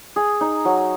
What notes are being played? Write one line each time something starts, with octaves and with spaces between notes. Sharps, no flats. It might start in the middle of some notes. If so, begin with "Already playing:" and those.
G#4
D#4
F#3